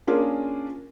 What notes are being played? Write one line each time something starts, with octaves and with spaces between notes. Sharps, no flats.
A#3 C#4 D4 F4 G#4 A#4